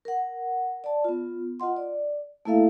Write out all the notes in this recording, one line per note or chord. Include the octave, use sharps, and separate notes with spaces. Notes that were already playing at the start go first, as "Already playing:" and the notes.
A#4 F#5
D5 A5
B3 F4
F4 D#5 F#5 C6
D5
A3 A#3 E4 A4 E5 F5